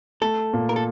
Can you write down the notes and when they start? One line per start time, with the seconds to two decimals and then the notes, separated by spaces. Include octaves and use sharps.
0.21 A3 A4
0.53 A#2
0.69 A#4
0.76 A4